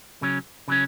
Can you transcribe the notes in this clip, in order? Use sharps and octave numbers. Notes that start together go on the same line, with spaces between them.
C#3 F#3 C#4
C#3 F#3 C#4